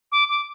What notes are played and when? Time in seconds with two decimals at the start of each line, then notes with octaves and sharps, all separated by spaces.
0.12 D6
0.29 D6